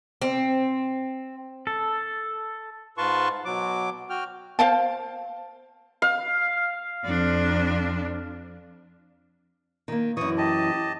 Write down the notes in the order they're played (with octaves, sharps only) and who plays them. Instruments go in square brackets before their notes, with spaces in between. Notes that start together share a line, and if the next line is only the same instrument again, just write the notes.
[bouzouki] C4
[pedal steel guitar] A4
[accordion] G#2 F4 B4 A5 C6 C#6
B2 F#3 D6
F#4 G5 F6
[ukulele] C5 F5 G5 A5
[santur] F5
[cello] F2 D4
[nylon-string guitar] D#3 A#3
[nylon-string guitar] F#2 E3 [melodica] C#6 D#6
[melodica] G4 D#5 A5